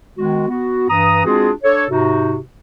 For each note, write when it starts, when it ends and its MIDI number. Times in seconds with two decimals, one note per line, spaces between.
0.17 0.48 51
0.17 0.48 56
0.17 0.48 59
0.17 0.48 66
0.48 0.86 59
0.48 0.86 66
0.90 1.25 43
0.90 1.25 52
0.90 1.25 82
0.90 1.25 87
1.25 1.51 56
1.25 1.51 60
1.25 1.51 62
1.25 1.51 65
1.25 1.51 66
1.25 1.51 68
1.63 1.84 62
1.63 1.84 69
1.63 1.84 73
1.90 2.37 44
1.90 2.37 48
1.90 2.37 63
1.90 2.37 66